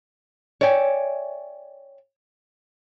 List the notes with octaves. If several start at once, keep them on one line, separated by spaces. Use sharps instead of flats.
C#5 D5 E5 G5 G#5